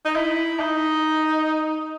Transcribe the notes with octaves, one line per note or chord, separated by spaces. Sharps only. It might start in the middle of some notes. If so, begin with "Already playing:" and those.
D#4
E4
D#4